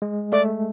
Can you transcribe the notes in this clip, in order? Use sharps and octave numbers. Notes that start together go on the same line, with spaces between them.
G#3
A3 D5